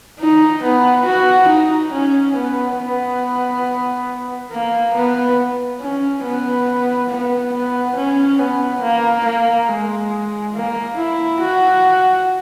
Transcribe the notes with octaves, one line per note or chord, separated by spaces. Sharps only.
D#4
B3
F#4
D#4
C#4
B3
B3
A#3
B3
C#4
B3
B3
B3
C#4
B3
A#3
A#3
G#3
A#3
E4
F#4